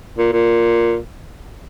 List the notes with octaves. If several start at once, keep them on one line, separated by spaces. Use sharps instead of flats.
A#2
A#2